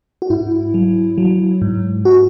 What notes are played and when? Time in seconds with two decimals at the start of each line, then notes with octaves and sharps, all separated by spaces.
0.22 F#4
0.30 G#2 E4
0.74 F#3
1.18 F#3
1.62 G#2
2.05 F#4